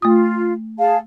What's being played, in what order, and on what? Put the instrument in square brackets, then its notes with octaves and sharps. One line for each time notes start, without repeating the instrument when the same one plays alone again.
[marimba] A3 D#6 [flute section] F4
[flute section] G#4 A5 [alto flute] F5